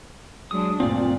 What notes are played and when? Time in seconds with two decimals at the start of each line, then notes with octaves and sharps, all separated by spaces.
0.51 F#3 G#3 D4 D#6
0.80 D2 G2 A#2 C4 D5